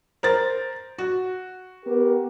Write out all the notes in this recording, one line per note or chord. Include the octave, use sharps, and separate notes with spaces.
A#4 C5 A6
F#4
B3 G4 A#4